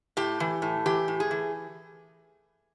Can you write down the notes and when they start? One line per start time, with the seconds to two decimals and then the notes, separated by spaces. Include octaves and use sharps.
0.17 A2 G4
0.40 E3
0.62 A2
0.86 E3 G4
1.08 A2
1.20 G#4
1.31 E3